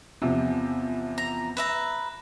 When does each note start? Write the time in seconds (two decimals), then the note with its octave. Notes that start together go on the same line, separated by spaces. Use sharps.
0.22 E2 C3 F3
1.18 A#5
1.57 B4 E5 A#5